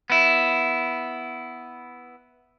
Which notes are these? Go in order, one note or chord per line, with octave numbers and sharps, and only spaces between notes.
B3 E4